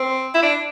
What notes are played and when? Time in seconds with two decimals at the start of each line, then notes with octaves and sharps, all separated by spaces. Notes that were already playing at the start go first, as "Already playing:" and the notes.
Already playing: C4
0.35 E4
0.43 D4